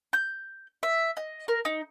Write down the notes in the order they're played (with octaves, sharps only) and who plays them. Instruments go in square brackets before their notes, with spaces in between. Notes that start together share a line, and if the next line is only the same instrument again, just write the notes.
[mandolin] G6
E5
D#5
A#4
D#4